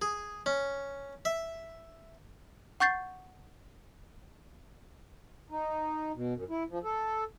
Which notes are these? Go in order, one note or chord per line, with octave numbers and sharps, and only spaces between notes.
G#4
C#4
E5
F#5 C#6 G6 A6 C7
D#4
B2
F#2
E4
F3
A4